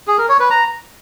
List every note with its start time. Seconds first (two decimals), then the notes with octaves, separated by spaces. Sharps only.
0.08 G#4
0.18 A#4
0.29 C#5
0.40 B4
0.50 A#5